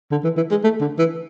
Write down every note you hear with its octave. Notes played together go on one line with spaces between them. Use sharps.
D3
E3
E3
G#3
A3
D3
E3